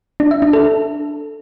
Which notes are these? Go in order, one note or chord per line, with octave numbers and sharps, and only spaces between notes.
D4
E5
D4
A4